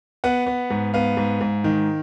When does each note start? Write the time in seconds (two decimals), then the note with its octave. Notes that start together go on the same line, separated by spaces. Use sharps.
0.24 B3 F#5
0.46 B3
0.70 G#2
0.94 B3 F5
1.17 G#2
1.41 G#2
1.64 D#3